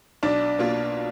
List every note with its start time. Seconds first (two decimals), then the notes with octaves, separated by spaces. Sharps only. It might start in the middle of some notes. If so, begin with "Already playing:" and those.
0.23 B1 D4
0.58 B2 A#3 F4